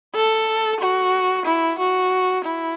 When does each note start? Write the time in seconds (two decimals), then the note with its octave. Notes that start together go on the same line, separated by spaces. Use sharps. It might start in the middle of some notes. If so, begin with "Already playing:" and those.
0.15 A4
0.80 F#4
1.46 E4
1.79 F#4
2.45 E4